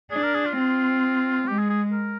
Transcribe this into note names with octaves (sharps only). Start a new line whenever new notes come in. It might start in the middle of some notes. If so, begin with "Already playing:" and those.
D4 G#4
A#4
G#4
F4
C4
G#3 G4
G#4
G#4
A#4